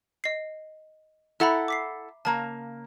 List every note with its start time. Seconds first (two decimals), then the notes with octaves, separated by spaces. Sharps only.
0.24 D#5 C7
1.40 E4 A4 E5 F#5 A#5 B5
1.68 D6 B6 C7
2.25 C#3 A#3 A5 A#5